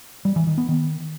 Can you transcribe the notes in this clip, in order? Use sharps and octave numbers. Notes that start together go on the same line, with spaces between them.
G3
E3
D#3
B3
D#3